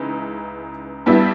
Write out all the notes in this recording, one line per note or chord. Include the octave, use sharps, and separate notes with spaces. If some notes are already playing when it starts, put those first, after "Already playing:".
Already playing: C#2 C#3 E3 D#4
G2 G3 B3 E4 G4